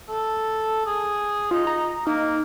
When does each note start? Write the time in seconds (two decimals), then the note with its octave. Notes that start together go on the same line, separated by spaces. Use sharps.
0.09 A4
0.86 G#4
1.51 D#4 F4
1.67 A#5
2.07 A#3 D#4